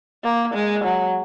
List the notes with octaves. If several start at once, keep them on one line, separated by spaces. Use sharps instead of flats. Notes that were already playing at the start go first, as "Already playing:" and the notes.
A#3
G#3
F#3